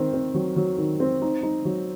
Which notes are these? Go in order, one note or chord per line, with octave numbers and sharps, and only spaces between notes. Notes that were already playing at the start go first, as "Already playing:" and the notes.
Already playing: D#3 C4
C4
F#3
F#3
D#3
C4
D#4
D#4
F#3